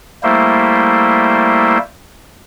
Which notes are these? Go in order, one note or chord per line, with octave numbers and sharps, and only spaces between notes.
G3 A3 A#3 E4 C5